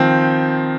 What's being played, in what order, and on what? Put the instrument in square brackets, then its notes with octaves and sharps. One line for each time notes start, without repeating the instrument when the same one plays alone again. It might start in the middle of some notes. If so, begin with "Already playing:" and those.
Already playing: [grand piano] D#3 F3 C4